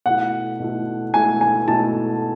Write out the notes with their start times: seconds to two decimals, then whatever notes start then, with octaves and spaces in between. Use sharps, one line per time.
0.06 B2 A3 E4 F#5
0.60 B2 A3 E4
1.14 B2 A3 E4 G#5
1.41 G#5
1.68 B2 A3 E4 A5